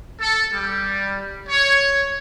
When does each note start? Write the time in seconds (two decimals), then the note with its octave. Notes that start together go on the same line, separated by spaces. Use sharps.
0.21 A4
0.53 G3
1.48 C#5